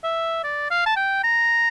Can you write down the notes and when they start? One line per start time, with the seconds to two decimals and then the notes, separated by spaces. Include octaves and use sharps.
0.04 E5
0.44 D5
0.70 F5
0.86 A5
0.97 G5
1.24 A#5